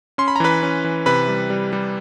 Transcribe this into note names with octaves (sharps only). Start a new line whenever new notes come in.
C#4 C6
B5
A#5
E3 B4 B5
C#4
E3
C3 B4 B5
G3
G3
G3